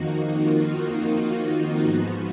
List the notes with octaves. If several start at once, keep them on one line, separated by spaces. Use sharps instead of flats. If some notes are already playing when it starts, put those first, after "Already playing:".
Already playing: F2 D#3 A#3 D#4 F#4
F4
F#4
F#4
G#2 F3 B3